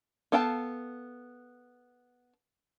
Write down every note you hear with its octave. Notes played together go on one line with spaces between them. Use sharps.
B3 A4 F5 G5 A5